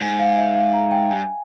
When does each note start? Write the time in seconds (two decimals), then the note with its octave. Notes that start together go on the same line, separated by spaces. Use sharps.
0.01 G#2 G#5
0.19 F5
0.38 E5
0.55 F5
0.73 A#5
0.91 G5
1.10 G2 G#5